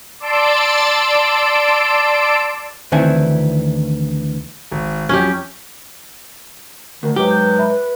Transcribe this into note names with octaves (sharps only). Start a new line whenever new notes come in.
D5 A5 C6 E6 D7
D2 D#3 E3 C4 E4 G#5
G#1
F2 F#3 C#4 G4
D2 D#3
G#2 F#3 G#3 G4 B4
G6
E5 B5